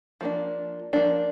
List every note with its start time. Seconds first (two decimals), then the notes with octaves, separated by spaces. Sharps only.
0.21 F3 A#3 D4
0.93 F3 A#3 D4